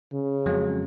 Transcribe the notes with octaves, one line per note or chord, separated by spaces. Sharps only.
C#3
F2 F#3 G#3